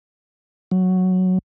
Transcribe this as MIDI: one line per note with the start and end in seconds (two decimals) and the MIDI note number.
0.71 1.38 54